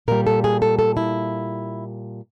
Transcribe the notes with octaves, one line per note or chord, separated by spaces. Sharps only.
A#2 G3 A#4
A4
G#4
A4
A4
E4